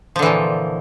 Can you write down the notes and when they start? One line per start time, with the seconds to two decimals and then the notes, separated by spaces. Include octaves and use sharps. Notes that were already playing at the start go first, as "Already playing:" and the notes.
0.16 F3
0.19 D3
0.22 E3
0.26 A#2